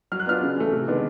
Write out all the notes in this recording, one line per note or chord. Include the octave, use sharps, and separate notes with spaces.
F#3 F6
F#6
B3 D4 F4 F6
C#3
E3 A3
C3
D#3 G#3 B3 D4